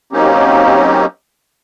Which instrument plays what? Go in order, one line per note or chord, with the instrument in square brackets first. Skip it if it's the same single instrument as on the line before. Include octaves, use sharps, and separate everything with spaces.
[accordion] F#3 A#3 C4 C#4 D#4 G4